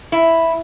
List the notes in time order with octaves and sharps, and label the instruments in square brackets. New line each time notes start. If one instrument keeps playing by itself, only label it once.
[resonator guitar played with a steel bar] E4